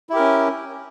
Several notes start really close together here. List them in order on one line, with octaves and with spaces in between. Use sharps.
E4 G4 A#4 C#4